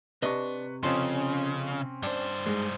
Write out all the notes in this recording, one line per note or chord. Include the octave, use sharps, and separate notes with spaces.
C3 D4 B4 D#5 C#6
F2 C#3 C4 C#4 A5 C6
G2 D4 C5
G#2 G#3